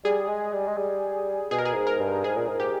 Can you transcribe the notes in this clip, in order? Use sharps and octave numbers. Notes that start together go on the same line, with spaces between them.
G3 G#4
G#3
G3
G#3
G3
B2 G#4
A#4
G#4
G#2
A#4
G2
G#2 G#4
A#2
G#2
G4